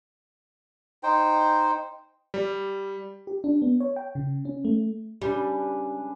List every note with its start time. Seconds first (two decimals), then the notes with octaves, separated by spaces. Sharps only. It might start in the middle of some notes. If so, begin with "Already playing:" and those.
1.03 D#4 C5 G5
2.34 G3
3.27 G4
3.44 D4
3.62 B3
3.80 C#5
3.96 G5
4.15 C#3
4.45 C#4
4.65 A3
5.22 C#3 G3 D4 B4